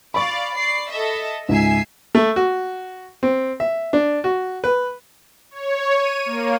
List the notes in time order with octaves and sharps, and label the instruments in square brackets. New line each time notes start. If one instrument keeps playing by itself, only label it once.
[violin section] D5 F5 [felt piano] B5 C#6
[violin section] D5 C7
A4 D#5 E5
[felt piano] C#2 G#2 [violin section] E5 G#5 C7
[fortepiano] A3
F#4
C4
E5
D4
F#4
B4
[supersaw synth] C#5
D#7
A#3